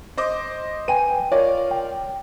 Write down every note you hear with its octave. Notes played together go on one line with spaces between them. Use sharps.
C5 D#5 D6
B4 G5 G#5 D#7
F4 A#4 C#5 D5
G5